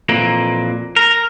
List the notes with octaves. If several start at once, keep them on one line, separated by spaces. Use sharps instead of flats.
F2 A#2 E3 A#3
A#4